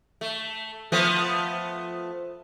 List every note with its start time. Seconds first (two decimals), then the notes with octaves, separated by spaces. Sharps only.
0.21 A3
0.92 F3 A3 B3